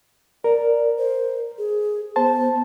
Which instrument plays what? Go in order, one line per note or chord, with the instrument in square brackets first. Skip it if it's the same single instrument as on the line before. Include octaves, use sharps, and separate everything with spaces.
[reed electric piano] A#4 [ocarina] D5
[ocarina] C5
G#4
[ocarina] B3 [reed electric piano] C5 A5